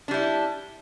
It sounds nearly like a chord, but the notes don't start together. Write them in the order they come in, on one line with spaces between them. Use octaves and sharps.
D4 G3 E4